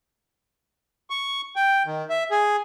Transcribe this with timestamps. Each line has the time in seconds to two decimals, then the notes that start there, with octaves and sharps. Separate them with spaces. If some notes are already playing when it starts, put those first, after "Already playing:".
1.10 C#6
1.56 G5
1.86 D#3
2.10 E5
2.31 G#4